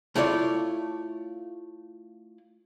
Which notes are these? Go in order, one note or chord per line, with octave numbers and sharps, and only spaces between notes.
A3 E4 F4 C#5 D5